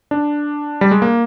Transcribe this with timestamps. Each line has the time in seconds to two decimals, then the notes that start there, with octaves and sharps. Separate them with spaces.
0.11 D4
0.81 G3
0.91 G#3
1.02 A#3